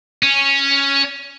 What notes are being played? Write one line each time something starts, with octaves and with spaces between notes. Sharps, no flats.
C#4